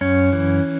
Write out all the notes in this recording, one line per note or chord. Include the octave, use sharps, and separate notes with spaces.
F#2 C#4
E3